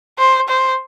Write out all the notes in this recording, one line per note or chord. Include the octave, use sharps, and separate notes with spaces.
C5
C5